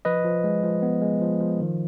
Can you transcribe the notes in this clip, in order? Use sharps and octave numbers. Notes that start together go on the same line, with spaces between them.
F3 B4 D#5
F3
G#3
F3
B3
G#3
F3
F3
D#3